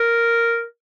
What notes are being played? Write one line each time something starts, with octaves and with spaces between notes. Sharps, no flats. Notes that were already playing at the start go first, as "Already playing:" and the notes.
Already playing: A#4